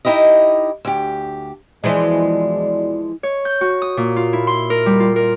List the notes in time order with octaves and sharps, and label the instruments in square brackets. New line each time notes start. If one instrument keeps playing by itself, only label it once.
[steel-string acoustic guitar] D#4 E4 G4 D#5
D2 G4
[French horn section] E2 B2 D5 [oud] E3 F3 G#3
[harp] C#5
G6
F#4
D#6
A#2
F4
E4
C6
A#4
G3
F4
A#4